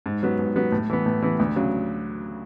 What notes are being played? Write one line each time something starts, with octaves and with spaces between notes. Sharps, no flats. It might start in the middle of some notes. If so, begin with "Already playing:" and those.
G#2
F#3 B3
G#2
F#3 B3
A2
E3 B3
A2
E3 B3
D2
C#3 F#3